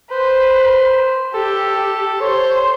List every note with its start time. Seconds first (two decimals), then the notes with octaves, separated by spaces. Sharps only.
0.11 B4 C5
1.34 G4 A4
2.21 C5 C#5